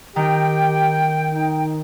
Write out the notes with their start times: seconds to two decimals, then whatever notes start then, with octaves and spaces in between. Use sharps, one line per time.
0.16 D#3 G4 G5
1.34 D#4